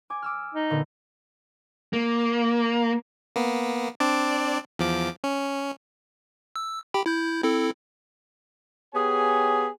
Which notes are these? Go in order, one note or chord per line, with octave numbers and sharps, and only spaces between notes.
G#5 D6
D6 E6 F6
D#4
A#2 D3 B3
A#3
A#3 B3
C4 D4 D5
E2 F3 D6
C#4
E6
G4 G5 B5
E4 G6
C4 E4 A4
B3 G4 G#4 C#5 G#5